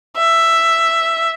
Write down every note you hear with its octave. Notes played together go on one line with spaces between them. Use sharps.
E5